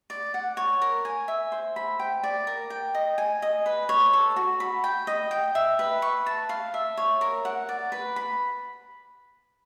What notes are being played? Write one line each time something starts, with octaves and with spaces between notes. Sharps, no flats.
D5
F#5
C#5
A#4
G#5
E5
C5
B5
G5
D5
A#4
G5
D#5
G#5
D#5
B4
C#5
A4
F#4
B5
G5
D#5
G5
E5
B4
C#6
A5
F5
E5
C#5
A#4
F#5
D5
B4
B5